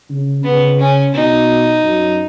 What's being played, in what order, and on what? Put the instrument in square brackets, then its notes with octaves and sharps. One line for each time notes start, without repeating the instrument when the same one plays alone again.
[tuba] C#3
[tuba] C#3 [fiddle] B3
[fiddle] C#4
[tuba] B2 [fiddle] D#4
[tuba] F#2